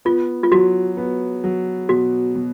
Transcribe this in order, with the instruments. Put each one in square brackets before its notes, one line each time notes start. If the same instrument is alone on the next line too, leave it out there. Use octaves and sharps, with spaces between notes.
[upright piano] B3 [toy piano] F4
[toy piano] F4
[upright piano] F#3 [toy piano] F#4
[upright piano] B3
F#3
[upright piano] B2 [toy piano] F#4
[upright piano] B2